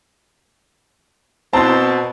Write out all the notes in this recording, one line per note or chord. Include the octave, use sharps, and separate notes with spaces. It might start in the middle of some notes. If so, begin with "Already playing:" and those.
B2 C4 A5 A#5 C6